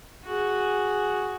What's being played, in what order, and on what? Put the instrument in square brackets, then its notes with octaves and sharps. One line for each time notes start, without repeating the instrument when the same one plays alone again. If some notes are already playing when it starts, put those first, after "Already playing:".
[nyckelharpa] F#4 G#4